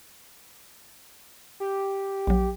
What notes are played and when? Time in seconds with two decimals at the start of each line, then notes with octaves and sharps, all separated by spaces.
1.60 G4
2.27 A#1 F#3